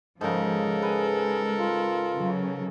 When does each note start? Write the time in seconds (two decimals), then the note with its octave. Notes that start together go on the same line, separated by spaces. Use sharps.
0.21 G#2 C#3 F3 A4 A#4
0.82 G#3 G#4 B4
1.59 F4
2.15 C#3 F#3